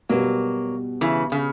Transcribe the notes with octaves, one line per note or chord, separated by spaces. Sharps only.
B2 F#3 G3 A#3 B3
C#3 E3
C#3